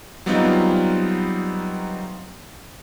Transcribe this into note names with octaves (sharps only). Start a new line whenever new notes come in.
F#3 G3 B3 C4 D#4 F4